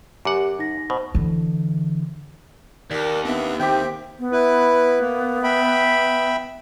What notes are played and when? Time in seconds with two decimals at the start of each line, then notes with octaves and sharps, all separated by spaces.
0.25 F#2 G4 F#5 D6
0.59 D#4 A#6
0.90 B2 C5
1.15 D3 E3
2.91 D#2 A#4 D5 D6
3.25 B3 C4 D4 E5
3.60 D#3 C4 G4 C5 E5 G5
4.19 B3
4.32 E4 B4
5.00 A#3
5.43 E5 G5 B5